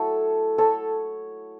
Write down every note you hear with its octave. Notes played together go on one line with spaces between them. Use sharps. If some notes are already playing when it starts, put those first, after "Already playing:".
Already playing: F#3 A3 E4 A4 C#5
A4 C#5